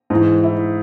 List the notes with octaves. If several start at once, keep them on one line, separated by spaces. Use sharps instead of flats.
G#2 E3
E4